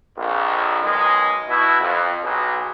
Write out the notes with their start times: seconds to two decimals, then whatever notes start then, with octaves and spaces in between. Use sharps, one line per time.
0.18 A#1 F2
0.82 B1 D#3 G#3
1.49 B2 E4
1.81 F2
2.23 B1 B2 F#3 G#4